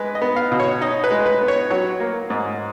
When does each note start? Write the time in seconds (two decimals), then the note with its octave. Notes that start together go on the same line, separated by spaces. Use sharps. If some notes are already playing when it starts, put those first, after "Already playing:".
Already playing: G#3 B4
0.15 D#5
0.22 B3
0.36 F5
0.52 B2
0.60 C#5
0.81 D#4 D#5
1.04 B4
1.11 G#3
1.26 B4
1.41 B3
1.48 C#5
1.70 F#3 C#5
2.00 A#3
2.30 G#2